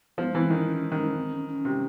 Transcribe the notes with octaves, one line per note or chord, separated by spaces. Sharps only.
F3 B3
E3 B3
C4
D#3 C#4
C#4
D#3 C#4
C4
C#4
C#4
C3